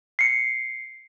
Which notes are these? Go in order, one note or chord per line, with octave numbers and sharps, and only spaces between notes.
C7 C#7